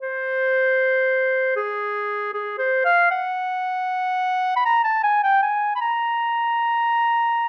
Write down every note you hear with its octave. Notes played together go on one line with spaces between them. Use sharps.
C5
G#4
G#4
C5
F5
F#5
B5
A#5
A5
G#5
G5
G#5
B5
A#5